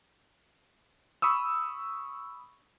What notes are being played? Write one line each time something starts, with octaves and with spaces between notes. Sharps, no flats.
B5 C#6 D#6 E6